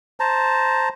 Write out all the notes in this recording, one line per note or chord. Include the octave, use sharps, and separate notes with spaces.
C5 A5 A#5